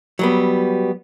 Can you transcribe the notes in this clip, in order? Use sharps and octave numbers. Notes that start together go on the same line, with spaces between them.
F#3 G3 B3